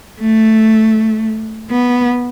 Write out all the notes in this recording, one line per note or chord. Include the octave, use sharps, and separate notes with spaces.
A3
B3